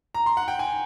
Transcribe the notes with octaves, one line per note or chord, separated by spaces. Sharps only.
A#5
C6
F#5
G5
G#5